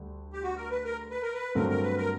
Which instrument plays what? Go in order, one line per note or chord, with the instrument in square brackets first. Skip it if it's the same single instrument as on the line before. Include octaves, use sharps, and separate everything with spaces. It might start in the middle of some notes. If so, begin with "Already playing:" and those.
Already playing: [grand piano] D2 D3 G3
[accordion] G4
F#4
A#4
B4
A#4
B4
A#4
B4
[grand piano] G2 D3 F#3 A3 C4 [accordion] A#4
[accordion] A#4
B4
A#4